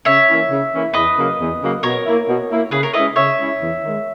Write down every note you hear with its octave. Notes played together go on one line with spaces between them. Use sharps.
C#3 C#5 E5
E3 A#3 C#4 E4
C#3
E3 A#3 C#4 E4
E2 B4 D#5
C#3 F#3 A#3
E2
C#3 F#3 A#3
B2 A#4 C#5
A#3 E4
B2
A#3 E4
C#3 G#4 B4
A#4 C#5
G#3 C#4 E4 B4 D#5
C#3 C#5 E5
G#3 C#4 E4
E2
D#3 G#3